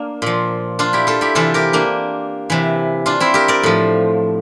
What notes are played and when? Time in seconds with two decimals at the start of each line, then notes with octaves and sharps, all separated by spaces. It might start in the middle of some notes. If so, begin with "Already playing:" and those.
Already playing: A#3 D4
0.22 A#2 F3
0.79 D4 F4
0.93 E4 G4
1.07 F4 A4
1.21 E4 G4
1.35 C3 E3 F4 A4
1.54 G4 A#4
1.73 A#3 D4
2.50 C3 E3
3.06 D4 F4
3.20 C4 E4
3.34 G4 A#4
3.48 A#4 D5
3.63 A2 F3